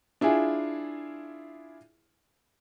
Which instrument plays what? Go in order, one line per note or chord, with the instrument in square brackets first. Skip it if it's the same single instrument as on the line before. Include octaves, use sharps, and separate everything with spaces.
[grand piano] D4 E4 F4 G#4